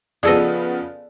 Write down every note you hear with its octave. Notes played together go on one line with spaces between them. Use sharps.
C#3 F3 B3 G#4 A4 D5 D#5